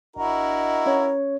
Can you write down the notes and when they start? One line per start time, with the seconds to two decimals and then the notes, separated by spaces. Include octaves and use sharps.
0.16 G#1 D4 E4 F#4 A#4 D#5
0.86 C#4 C#5